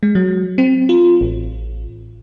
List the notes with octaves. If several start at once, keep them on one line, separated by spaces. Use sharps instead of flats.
G#3
F#3
C4
F4
A1